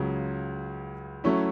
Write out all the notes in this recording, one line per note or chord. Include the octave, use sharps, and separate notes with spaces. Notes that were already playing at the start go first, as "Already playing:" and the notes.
Already playing: C#2 C#3 F#3
F#3 A3 C#4 E4